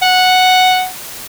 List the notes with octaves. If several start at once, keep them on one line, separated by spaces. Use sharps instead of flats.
F#5